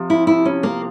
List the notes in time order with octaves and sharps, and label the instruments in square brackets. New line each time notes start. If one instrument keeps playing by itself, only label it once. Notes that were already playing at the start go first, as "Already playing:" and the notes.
Already playing: [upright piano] C3 F3
[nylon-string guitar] E4
E4
C#4
A#3